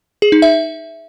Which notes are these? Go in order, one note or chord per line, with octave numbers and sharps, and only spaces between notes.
G#4
D#4
E5